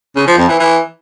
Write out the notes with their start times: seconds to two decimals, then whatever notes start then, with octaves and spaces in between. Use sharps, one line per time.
0.16 C#3
0.27 F3
0.38 F2
0.48 E3
0.59 E3